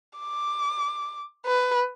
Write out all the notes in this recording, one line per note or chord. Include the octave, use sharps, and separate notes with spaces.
D6
B4